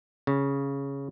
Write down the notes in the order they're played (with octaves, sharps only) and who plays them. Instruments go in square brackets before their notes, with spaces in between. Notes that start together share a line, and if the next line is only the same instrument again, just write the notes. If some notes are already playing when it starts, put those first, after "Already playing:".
[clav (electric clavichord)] C#3